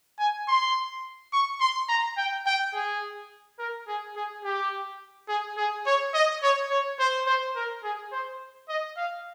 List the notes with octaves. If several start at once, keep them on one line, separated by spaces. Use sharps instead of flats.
G#5
C6
C#6
C6
A#5
G5
G5
G#4
A#4
G#4
G#4
G4
G#4
G#4
C#5
D#5
C#5
C#5
C5
C5
A#4
G#4
C5
D#5
F5